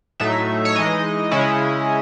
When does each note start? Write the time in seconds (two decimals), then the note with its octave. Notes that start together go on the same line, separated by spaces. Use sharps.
0.20 A2 F#3 A3 D#4 E5
0.65 C#5
0.75 E3 G#3 D#4 D#5
1.31 C#3 G#3 C#4 E4